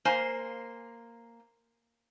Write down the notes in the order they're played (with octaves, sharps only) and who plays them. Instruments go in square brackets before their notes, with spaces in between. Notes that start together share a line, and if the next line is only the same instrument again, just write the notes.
[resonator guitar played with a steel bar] A#3 C5 G#5